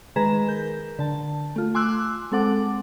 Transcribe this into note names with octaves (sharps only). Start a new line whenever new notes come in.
D#3 G#3 G#4 B4 A#5 E7
A#4 G6
D3 A5
A3 F4
G#5 C6 D6 E6 F#6
G#3 C4 A4 F#5 D6